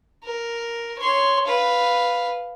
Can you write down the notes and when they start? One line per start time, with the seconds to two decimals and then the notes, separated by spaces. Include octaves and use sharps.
0.23 A#4
0.99 C#5 C6
1.46 B4 F5